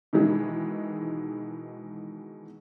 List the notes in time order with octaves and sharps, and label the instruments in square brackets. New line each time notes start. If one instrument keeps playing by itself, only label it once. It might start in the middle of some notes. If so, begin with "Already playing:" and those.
[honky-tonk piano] B2 D#3 E3 G#3